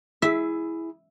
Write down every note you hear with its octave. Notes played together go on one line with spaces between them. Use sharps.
E4 G#4 E5